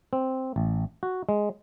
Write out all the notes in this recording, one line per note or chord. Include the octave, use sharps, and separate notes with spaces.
C4
A1
F#4
G#3